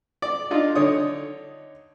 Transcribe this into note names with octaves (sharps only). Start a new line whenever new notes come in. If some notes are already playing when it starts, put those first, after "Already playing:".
D5
D4 D#4 F4
D3 D#4 C#5 D#6